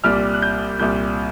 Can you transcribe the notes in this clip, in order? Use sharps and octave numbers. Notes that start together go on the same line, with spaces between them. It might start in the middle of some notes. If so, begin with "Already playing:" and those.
C2 A#2 G3 F6
F#6
G6
C2 A#2 G3 G6